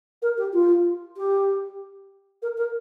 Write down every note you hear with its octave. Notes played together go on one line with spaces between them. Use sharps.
A#4
G4
F4
G4
A#4
A#4